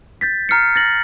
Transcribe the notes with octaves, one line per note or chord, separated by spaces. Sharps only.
G6 A6 B6
A#5 F6 C7 C#7
A6 A#6 F#7